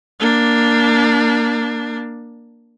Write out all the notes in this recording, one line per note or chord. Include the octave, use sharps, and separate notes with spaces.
A#3 D4